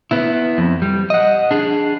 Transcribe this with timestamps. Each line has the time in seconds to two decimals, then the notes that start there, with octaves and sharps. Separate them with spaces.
0.11 B3 E4
0.58 F2
0.82 G3
1.10 D#5 F#5
1.51 D4 G#4